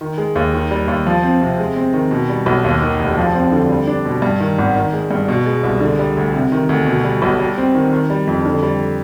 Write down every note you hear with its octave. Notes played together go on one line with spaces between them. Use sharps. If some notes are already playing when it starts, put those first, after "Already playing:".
D#3
G#3
D#2
D#3
G3
D#2
F3
C4
C3
G#3
C4
D#3
B2
G3
B1
D#2
D#3
F1
F3
C4
D3
G3
D4
B2
G2
D#3
G#1
D#3
G#3
G2
B2
G#3
C2
D3
G3
D2
C3
D#3
D2
B2
G3
B1
G3
C4
D#3
D#3
G3
F2
D3
G3